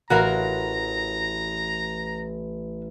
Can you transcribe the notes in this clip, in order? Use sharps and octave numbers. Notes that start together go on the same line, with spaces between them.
A1 F#4 A#4 F5 A#5